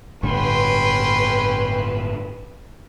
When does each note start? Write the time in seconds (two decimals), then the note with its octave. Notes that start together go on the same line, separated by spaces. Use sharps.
0.23 G1 A2 D3 C#4 B4 G5 C6